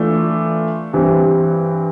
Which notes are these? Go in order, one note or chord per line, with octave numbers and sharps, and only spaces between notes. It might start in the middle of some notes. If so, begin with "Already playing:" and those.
Already playing: E3 A3 D4 F4
G2 E3 G3 C4